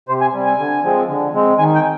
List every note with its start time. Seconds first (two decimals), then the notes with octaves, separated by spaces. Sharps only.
0.08 C3 C5
0.21 G#5
0.34 G3 C4
0.46 G#5
0.59 D3
0.84 F3 G#3 C4
1.08 D3
1.34 G#3 C4
1.59 D#3 G#5
1.75 G5